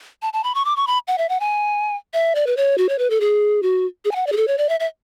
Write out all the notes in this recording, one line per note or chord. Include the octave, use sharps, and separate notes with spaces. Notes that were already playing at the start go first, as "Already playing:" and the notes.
A5
A5
B5
C#6
D6
C#6
B5
F#5
E5
F#5
G#5
E5
D5
B4
C#5
F#4
C#5
B4
A4
G#4
F#4
G#4
G#5
F#5
D5
G#4
A4
C#5
D5
E5
E5